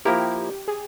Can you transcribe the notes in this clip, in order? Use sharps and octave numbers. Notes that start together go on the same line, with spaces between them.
F3 A#3 E4 G4 A#4
G#4